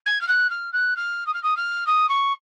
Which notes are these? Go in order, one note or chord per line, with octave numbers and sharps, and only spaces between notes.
G#6
F6
F#6
F6
F#6
F6
D#6
F6
D#6
F6
D#6
C#6